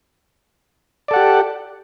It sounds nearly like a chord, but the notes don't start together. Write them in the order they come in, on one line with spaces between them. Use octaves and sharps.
D5 A4 F#5 G4